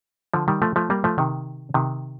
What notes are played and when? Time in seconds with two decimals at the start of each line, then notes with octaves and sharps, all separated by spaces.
0.34 D3 F3
0.48 D#3 G3
0.62 F3 A3
0.76 F3 A3
0.90 G3 A#3
1.04 F3 A3
1.18 C3 D#3
1.74 C3 D#3